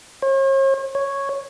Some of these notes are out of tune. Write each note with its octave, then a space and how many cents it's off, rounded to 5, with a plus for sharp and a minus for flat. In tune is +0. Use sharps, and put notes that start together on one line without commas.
C#5 -45
C#5 -5